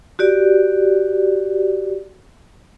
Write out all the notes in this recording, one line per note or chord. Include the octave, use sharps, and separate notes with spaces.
F#4 G4 D5